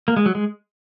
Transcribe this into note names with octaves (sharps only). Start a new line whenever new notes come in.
A#3
G#3
F#3
G#3